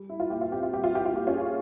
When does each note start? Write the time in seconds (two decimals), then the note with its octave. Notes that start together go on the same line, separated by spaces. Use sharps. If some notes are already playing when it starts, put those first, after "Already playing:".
Already playing: G3
0.09 E4
0.20 F4
0.30 A#2 G4
0.41 F4
0.50 C4 G4
0.63 F4
0.72 G3 G4
0.84 F4
0.92 E4 G4
1.05 F4
1.12 A#3 G4
1.27 C#4 F4
1.33 G#4